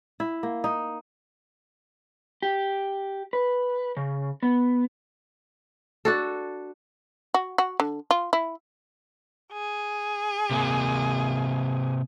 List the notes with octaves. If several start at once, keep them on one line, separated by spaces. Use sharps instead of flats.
E4
A#3
D#4
G4
B4
C#3
B3
D4 F#4 A4
F#4
F#4
D3
F4
E4
G#4
C3 A#3